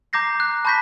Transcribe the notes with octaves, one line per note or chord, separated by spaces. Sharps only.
A#5 D6 G6 A#6 C7
F#6
A5 B5 C#6 G6 A#6 B6